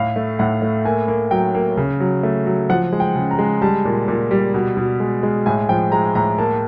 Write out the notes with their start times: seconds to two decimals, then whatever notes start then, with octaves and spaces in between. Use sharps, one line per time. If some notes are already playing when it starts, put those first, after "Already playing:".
Already playing: A2 F5
0.16 A3
0.39 A2 F#5
0.62 A3
0.85 A#3 G#5
1.08 A#3
1.31 F#3 G5
1.55 A#3
1.77 C#3
2.00 F#3
2.23 A3
2.46 F#3
2.70 F3 F#5
2.93 G#3
3.00 G5
3.16 C#3
3.31 A#5
3.39 G#3
3.62 G3 A5
3.85 A#2
4.08 A#2
4.31 G3
4.54 B2
4.77 B2
5.00 G#3
5.23 G#3
5.46 A2 G#5
5.69 F3 G5
5.92 G#3 A#5
6.15 A2 A#5
6.38 A#3 A5